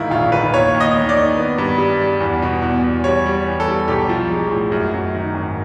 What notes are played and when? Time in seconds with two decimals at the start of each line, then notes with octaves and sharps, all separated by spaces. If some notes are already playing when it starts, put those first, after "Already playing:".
Already playing: D2 G#2 D#3 E4 F4
0.11 A#1 F4
0.32 D#3 B4
0.53 D#2 C#5
0.74 D#2
0.80 D#5
0.95 D#2
1.09 D5
1.16 D#3
1.37 B3
1.58 G2
1.78 G3
2.00 G3
2.20 E2
2.42 B2
2.62 E2
2.84 E2
3.04 G3 C#5
3.26 G3
3.47 E3
3.60 A4
3.68 G3
3.88 B1 G4
4.09 F3
4.31 G#3
4.51 A2
4.72 F#2
4.94 F#2
5.15 D#3
5.34 G#1